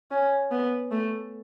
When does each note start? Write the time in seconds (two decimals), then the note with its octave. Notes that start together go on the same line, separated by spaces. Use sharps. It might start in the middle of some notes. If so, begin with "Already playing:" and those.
0.11 C#4
0.51 B3
0.91 A3